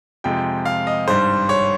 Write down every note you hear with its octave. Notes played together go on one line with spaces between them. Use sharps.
F2 C3 F3 G#3 G5
F5
D#5
G#1 G2 G3 C5
C#5